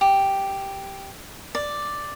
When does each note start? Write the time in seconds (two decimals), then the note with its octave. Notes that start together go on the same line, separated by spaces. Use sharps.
0.01 G4
1.55 D5